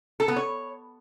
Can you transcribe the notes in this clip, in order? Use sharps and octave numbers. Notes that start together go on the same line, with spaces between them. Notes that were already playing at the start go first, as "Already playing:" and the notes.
A4
B3
C#5